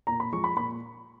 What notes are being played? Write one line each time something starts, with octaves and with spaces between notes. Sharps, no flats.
A#2 A#5
B5
F3 G#3 C#6
B5
A#2 B5